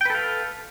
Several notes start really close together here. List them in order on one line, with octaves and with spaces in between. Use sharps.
G5 B4 A4 F5